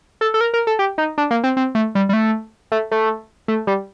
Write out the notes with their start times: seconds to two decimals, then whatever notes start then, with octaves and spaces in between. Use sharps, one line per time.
0.21 A4
0.34 A4
0.41 A#4
0.54 A#4
0.67 A4
0.79 G4
0.98 D#4
1.18 D4
1.31 A#3
1.44 C4
1.57 C4
1.75 A3
1.95 G3
2.09 G3
2.13 A3
2.72 A3
2.91 A3
3.48 A3
3.67 G3